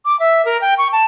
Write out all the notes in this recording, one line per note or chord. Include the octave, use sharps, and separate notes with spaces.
D6
E5
A#4
G5
C#6
A5